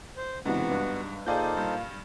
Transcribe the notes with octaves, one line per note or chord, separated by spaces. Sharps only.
C5
C#2 G#2 C3 E3 B3 D4 F#4
G2
A#2 D#4 G#4 A4 C5 D5 F5 G6
G2